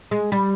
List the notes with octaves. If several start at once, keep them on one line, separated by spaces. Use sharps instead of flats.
G#3
G3